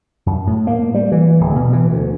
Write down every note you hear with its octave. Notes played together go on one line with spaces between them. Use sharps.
F#2
A2
A#3
G3
E3
D1
B2
E3
D2